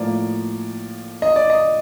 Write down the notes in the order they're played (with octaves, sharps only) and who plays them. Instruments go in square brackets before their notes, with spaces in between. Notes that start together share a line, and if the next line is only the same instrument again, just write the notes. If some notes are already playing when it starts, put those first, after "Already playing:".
Already playing: [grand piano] A2 F3 A#3 D5
D#5
D5
D#5